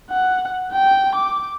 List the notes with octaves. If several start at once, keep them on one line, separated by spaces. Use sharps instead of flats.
F#5
G5
D6